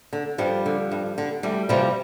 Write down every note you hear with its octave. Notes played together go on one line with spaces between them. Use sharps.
D3
G2 F3 G3
D3
G2
D3
E2 G3 A3
C3 E3 F3 G3